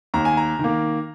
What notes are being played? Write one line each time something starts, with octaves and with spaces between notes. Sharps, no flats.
D#2 A#5
G#5
A#5
D#3 A#3